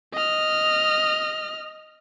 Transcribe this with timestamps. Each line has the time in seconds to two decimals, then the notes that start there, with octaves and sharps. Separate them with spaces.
0.13 D#5 F6